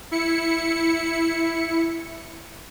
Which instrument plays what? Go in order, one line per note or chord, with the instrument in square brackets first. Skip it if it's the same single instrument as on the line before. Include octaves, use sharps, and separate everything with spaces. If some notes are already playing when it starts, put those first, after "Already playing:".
[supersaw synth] E4 C#7